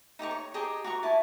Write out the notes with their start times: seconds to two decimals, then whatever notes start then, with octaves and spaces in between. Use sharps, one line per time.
0.19 D#4 G4 A#5 C#6
0.31 C#5
0.54 G4 G#4 D#5 A#5
0.84 F#4 A#5 C#6
1.03 E4 G#5 A5